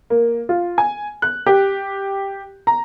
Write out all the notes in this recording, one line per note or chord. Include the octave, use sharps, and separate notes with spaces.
A#3
F4
G#5
F#6
G4
A#5